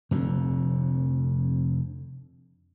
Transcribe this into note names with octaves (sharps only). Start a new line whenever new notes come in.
F1 F2 D3